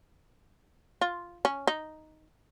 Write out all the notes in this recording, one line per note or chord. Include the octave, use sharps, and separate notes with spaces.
F4
C#4
D#4